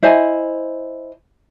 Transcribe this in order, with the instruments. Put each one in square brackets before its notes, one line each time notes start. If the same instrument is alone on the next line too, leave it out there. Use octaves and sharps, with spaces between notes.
[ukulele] E4 C5 D#5 G#5